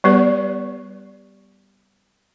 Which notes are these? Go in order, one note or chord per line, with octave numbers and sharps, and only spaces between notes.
G3 B3 G4 B4 D5